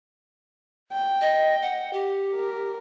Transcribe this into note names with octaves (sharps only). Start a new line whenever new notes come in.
G5
D#5
F#5
G4
A#4